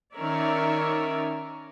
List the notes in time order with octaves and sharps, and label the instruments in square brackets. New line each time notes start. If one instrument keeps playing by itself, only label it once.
[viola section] D#3 C#4 A#4 C#5 D5 E5